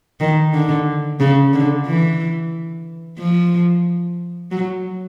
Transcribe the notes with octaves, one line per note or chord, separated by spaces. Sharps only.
D#3
D3
C#3
D3
E3
F3
F#3